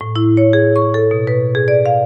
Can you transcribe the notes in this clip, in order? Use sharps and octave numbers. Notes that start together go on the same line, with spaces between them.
A2
E4
C#5
G#4
C#6
A4
B2
B4
G#4
D5
F5